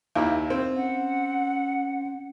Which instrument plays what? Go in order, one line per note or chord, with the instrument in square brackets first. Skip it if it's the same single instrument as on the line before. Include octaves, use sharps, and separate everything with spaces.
[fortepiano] D#2 E4 [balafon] F5
[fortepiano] C4
[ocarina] C#4 [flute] F#5